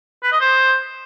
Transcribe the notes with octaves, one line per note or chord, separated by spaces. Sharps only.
B4
D#5
C5